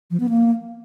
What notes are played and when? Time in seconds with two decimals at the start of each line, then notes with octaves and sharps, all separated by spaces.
0.11 F3
0.20 B3
0.29 A#3